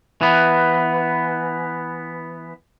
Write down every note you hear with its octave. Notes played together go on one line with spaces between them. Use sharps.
E3 B3